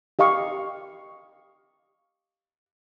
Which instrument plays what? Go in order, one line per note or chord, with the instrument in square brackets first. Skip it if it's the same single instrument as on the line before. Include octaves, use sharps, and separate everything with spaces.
[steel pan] G4 D#5 F5 C#6